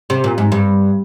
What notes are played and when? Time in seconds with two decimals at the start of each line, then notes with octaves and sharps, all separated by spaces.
0.10 C3
0.24 A#2
0.38 G#2
0.52 G2